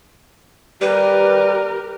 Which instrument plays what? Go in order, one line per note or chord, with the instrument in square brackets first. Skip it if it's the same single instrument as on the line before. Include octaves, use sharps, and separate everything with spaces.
[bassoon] G3 [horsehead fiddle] G4 A#4 [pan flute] B4